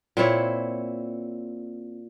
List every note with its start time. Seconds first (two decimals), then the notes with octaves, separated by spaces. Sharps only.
0.17 A#2 C4 E4 C#5